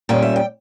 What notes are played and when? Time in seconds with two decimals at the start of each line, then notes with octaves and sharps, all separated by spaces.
0.09 A#2 G3 C#4 G5
0.22 E5
0.36 G5